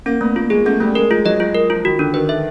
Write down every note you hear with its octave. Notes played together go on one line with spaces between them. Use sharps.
A#3 C#4
A3 B3
A#3 F4
G#3 G#4
A3 C#4
G3 A3
G#3 A#4
G#3 F4
F#3 D#5
F#3 F4
A#4
F3 F4
D#3 F#4
D3 D4
D#3 B4
D3 E5